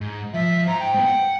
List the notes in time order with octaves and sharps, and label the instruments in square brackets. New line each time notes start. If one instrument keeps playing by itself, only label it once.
[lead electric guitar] G#2
[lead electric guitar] F3 [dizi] E5
[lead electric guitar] G#2 C5 [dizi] A#5
[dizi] G5
[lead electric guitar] G#2 B3
F#5